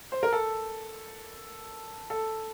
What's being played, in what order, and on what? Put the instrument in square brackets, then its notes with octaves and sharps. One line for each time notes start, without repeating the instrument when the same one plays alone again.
[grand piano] C5
A#4
A4
A4